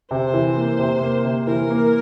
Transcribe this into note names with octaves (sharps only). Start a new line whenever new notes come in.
C3 C5
E3
A#3
C3
A#3
C3
E3 A#4
A#3